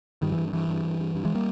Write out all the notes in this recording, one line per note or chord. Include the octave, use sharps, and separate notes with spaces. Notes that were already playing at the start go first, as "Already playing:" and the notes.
G2 D#3 G3
E3
G2
G2 E3
G2
G2
G2
G2
E3 G#3
G3 A#3